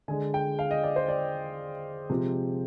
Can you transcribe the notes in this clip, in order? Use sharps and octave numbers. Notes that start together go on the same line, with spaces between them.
D3 G#3 D4 G#5
G5
F5
D#5
D5
C5
D5
C3 F3 G#3 C4